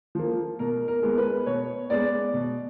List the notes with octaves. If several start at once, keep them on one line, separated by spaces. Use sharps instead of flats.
F3 A#3
B2 A#4
A#4
G#3 B3
B4
B2 C#5
G#3 B3 D5
B2